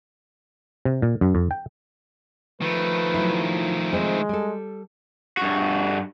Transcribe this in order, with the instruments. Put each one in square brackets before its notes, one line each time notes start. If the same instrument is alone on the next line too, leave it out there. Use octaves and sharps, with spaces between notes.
[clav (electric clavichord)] C3
A#2
F#2
F2
G5
[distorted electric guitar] D#3 A3 [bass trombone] F3 [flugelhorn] B4
[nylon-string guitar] F#3 E4
[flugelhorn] G#3 [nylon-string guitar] C4 D#4 C5
[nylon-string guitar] G3 A4
[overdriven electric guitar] G2 F#4